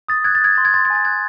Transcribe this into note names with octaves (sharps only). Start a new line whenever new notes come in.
D#6 A6
F#6 G#6
A6
D#6 G#6
C6 A6
G#6
C6 A6
G#6
G#5 A6
F#6 G#6